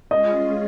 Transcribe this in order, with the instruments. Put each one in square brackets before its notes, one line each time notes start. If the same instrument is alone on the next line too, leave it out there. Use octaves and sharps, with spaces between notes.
[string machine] G#3 C#4 F4 G#4 [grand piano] D#5